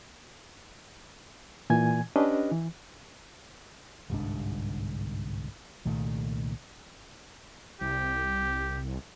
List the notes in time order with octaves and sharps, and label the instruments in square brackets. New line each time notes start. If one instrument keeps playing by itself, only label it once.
[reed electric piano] A#2 E3 G#5 G#6
C#4 D4 G4 B4 D#5
E3
[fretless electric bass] G1 C2 G#2 D4
C2 A#2 D#3 A3
[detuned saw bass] C2 [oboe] G4